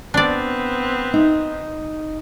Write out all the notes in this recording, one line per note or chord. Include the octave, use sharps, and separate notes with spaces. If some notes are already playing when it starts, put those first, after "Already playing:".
B3 C4 D4 D5
D#4